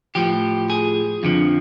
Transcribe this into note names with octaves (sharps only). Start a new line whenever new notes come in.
A2 F3 G4
G#4
F2 D3 F3